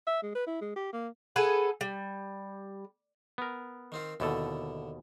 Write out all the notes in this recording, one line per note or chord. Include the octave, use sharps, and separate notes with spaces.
E5
G#3
B4
E4
G#3
G4
A#3
G#4 A4 B4 F#5
G3
B3 A#4
D#3 C4 F4
D#2 B2 D3 E4 A4